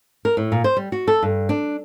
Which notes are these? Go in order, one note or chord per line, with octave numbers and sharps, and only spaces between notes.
A#4
A2
A#2
C5
G3
F#4
A4
G2
D4